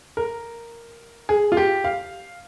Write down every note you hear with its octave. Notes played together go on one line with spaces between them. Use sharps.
A#4
G#4
F4
G4
F5